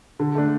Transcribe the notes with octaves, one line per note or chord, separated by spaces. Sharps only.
D3
A3 D4